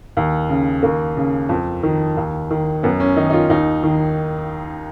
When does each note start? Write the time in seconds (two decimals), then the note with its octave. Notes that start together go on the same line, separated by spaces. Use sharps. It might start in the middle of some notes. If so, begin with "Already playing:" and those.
0.17 D#2
0.49 C#3
0.83 D#2 A#3
1.17 C#3
1.49 F2
1.83 D#3
2.17 D#2
2.51 D#3
2.83 F#2 B3
3.00 C#4
3.17 D#3 D#4
3.30 D#4
3.33 F4
3.50 D#2 D#4
3.83 D#3